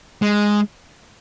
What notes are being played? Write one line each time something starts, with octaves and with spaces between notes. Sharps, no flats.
G#3